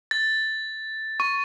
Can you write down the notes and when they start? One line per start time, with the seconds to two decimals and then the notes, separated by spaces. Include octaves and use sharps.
0.11 A6
1.20 C#6